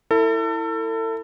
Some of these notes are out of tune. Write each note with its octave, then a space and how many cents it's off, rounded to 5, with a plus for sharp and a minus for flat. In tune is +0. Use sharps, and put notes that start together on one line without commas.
E4 +0 A4 +35